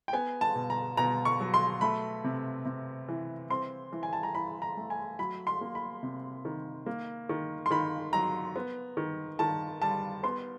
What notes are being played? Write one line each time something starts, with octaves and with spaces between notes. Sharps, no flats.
G5
B3 G#5
A5
B2
A#5
B2 A#5
C#6
F#3
C6
A3 B5
C3
C3
E3
C4 C6
E3
G#5
A5
A#5
E3 B5
A#5
A3
G#5
F#3 B5
C6
A#3
B5
C3
D#3
A#3
D#3
C6
D#3 B5
F#3 A#5
B3
D#3
D#3 A5
G3 A5
B3 C6